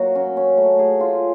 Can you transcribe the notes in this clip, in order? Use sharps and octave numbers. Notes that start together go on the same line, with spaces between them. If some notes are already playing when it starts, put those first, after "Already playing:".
Already playing: F#3 A#3 F#4
C#4
C#4
A3
G#4
F4